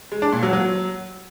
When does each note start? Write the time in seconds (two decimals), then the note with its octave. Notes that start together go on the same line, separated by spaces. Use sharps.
0.12 G#3
0.22 D4
0.32 A#2
0.43 F#3
0.53 F#3